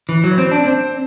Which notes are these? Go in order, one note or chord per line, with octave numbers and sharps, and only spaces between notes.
E3
F#3
C4
D4
C4